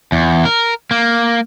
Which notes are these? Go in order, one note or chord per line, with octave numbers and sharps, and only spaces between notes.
E2
A#4
A#3